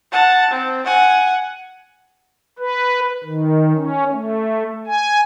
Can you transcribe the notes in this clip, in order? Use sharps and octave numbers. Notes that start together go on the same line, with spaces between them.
F#5 A5
C4
F#5 G#5
B4
D#3
C#4
A3
G#5